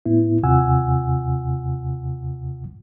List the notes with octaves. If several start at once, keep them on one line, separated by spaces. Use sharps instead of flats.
A2 B3 E4
D#2 C3 F4 F#5 G#5 E6